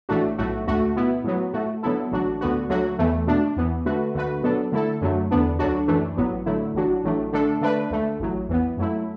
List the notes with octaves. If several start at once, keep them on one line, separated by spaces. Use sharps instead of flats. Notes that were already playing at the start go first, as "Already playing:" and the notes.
A1 A2 A3 D4 F#4
B1 A2 A3 F#4
D2 D3 A3 F#4
B2 B3 E4
A2 F#3 B3
A2 A3 F#4
D3 F#3 B3 E4 A4
A1 A2 F#3 D4 F#4
D2 D3 B3 F#4
D2 D3 F#3 A3 F#4
E2 E3 A3
B2 A3 D4
E2 E3 B3
D3 A3 F#4 B4
D2 D3 A3 F#4 B4
B2 F#3 B3 D4 A4
D3 A3 E4 A4
F#2 D3 F#3 A3
E2 D3 B3 D4
D2 D3 F#3 D4 F#4
F#2 E3 A3 D4
A1 A2 F#3 B3
D3 F#3 A3 E4
A1 A2 F#3 D4 F#4
A1 A2 F#3 A3 D4
D3 A3 D4 A4
D3 A3 D4 B4
D2 D3 A3
A1 A2 F#3
E2 E3 B3
F#2 F#3 A3 E4